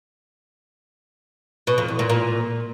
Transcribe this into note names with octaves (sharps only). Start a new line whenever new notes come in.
B2
F2
E2
A#2
A#2